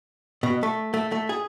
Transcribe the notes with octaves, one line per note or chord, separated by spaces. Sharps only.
B2
A3
A3
A3
G#4